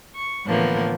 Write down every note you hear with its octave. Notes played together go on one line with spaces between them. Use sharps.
C#6
A2 D3 E3 F3 A#3 B3